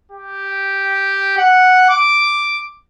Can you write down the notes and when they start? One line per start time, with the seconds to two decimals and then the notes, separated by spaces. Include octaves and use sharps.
0.12 G4
1.37 F#5
1.89 D6